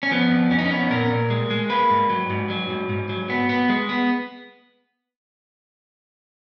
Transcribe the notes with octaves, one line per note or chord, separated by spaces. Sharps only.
C#4
F3 B3
F2
F2 C#4
D#4
C#4
B3
A#2 A#4
A#2
G#3
G#3
A#3 B4
G#2
F#3
G#2
F#3
G#2
G#2
F#3
B3
B3
G#3
B3